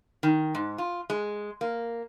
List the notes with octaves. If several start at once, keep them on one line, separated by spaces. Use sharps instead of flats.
D#3
G#2
F4
G#3
A#3